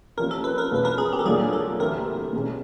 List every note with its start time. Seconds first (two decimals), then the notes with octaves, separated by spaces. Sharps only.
0.17 C3 F3 A#3 C#4 F4 A#4
0.31 A4
0.44 B4
0.58 A#4
0.71 E2 B2 G#3 C#4 F4 B4
0.85 A#4
0.98 G#4
1.13 G4
1.19 A4
1.25 A#2 F#3 A#3 D4 F4 G#4
1.53 A4
1.79 D2 C3 E3 A#4
2.33 B2 G#3 C#4